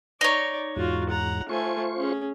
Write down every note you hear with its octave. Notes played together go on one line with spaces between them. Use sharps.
D#4 C#5 D5
E2 G#2 F4 F#4
F#5 A#5
A3 F4 C5 G#5 C#6
C#4 G#4